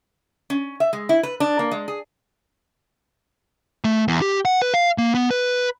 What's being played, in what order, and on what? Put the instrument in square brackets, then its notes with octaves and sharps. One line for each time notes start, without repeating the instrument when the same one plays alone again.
[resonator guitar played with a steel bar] C#4
E5
G#3
E4
B4
D4
A#3
G#3
G#4
[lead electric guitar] A3
E2
G4
F#5
B4
F5
A#3
B3
B4